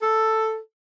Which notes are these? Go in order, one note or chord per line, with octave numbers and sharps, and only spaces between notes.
A4